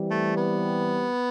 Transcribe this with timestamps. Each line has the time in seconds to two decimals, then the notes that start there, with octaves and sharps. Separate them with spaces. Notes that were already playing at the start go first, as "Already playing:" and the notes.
Already playing: E3 G3 C4 G4
0.11 A3
0.37 B3